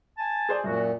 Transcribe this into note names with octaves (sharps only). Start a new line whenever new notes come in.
G#5 A5
G#4 C5 D5
F#2 A#2 F#4